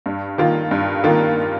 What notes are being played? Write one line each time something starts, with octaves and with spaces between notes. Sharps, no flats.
G2
D#3 A#3 F4
G2
D#3 A#3 F4